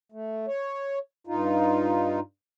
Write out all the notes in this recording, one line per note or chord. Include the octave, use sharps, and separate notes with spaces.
A3
C#5
G2 D#4 F4